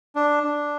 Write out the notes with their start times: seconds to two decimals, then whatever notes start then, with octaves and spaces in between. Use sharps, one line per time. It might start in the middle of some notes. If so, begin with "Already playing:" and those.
0.15 D4
0.43 D4